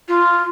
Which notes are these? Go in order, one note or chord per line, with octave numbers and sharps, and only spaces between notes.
F4